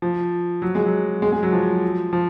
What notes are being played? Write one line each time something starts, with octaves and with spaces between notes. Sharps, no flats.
F3
F#3
G#3
F#3
G#3
G#3
F#3
F3
F3